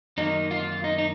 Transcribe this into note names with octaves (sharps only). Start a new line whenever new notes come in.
F#2 D#3 A#3 D#4
F4
D#4
D#4